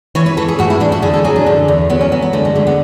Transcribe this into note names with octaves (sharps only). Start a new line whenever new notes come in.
E3 C#5
B4
E3 A4
G#4
A2 F#4
E4
A2 D4
F#4
D3 G#4
A4
F#3 G#4
D4
D3
E2
F#3 B3
C#4
F#3 B3
B3
D3 A3
G#3
D3 A3
B3